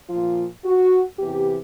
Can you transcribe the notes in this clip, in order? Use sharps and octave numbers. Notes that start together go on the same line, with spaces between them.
A#2 F3 F4
F#4
E2 C3 E3 G4